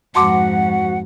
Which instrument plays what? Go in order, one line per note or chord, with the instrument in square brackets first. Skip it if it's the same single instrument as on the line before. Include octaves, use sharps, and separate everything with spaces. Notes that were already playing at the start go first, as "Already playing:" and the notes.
[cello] F2 G#2 [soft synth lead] F#4 [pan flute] F#5 [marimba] A5 C6 D6